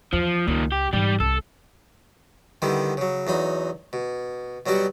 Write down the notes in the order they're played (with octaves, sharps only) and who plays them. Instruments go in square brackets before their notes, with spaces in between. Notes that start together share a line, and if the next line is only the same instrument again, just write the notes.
[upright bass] E2 [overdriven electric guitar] F3
[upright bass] C#2 [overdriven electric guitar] A#2 D#3
[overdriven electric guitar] G4
[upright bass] G#2 E3 [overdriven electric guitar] G3 G4
[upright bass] C2 [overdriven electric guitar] A4
[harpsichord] D3 D#3 G3 B3 E4
C#3 F#3
E2 F#3 D#4 B5
B2
B2 F#3 G3 F#4 G4